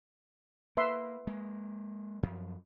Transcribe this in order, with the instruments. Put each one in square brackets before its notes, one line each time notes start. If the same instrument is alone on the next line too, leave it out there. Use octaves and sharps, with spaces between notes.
[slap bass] A#3 [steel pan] B4 E5 C6
[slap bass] G#3 A#3
F#2 F3